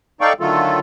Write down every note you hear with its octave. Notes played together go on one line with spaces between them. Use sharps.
D#4 A4 D5 F5 G5 C#6
D3 D#3 F#3 A3 F4 A4